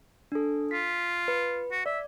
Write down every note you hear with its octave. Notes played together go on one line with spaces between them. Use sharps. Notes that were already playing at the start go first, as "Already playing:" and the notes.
D4 A4
F4 B6
B4
F#4
D5 E5